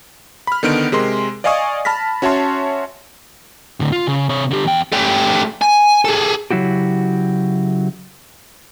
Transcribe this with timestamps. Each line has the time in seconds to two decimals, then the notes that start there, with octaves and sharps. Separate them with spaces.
0.47 B5 F6
0.63 D3 D#3 B3 D#4 F6 D7
0.92 C3 G#3 A#4 C6
1.44 D5 D#5 F5 G#5 C#6 D#6
1.85 A5 B5 F6 A#6 B6
2.22 C#4 F#4 C#5 E5 A5 C6
3.80 A2 D3
3.92 F4
4.07 C#3
4.29 C3 C#5
4.51 D3 G4
4.65 E2 G5
4.92 A3 G4
5.61 G#5
6.05 G#4 A4
6.50 C#3 F#3 E4 F#4 G4